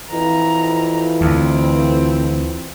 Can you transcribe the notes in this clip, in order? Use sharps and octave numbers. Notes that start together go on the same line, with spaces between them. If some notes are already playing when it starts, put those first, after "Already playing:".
F2 E3 A#5
D2 C4